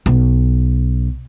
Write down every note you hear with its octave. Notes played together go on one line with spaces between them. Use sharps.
B1